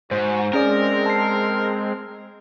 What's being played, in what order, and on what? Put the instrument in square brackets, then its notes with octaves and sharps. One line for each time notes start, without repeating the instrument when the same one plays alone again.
[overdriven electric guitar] G#2 [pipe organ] F#4 [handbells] C5
[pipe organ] G#3 C4 [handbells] C#4 G#4 D5 [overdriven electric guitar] A#4
[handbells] A5 C7